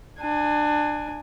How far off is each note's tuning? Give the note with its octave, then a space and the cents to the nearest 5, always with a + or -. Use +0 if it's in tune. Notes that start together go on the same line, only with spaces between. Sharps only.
D4 +25 G#5 +0